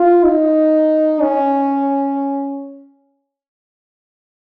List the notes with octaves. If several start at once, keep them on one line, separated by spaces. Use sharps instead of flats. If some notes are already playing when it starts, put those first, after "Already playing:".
Already playing: F4
D#4
C#4